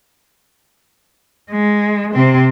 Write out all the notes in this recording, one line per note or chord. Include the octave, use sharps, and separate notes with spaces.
G#3
C3 C4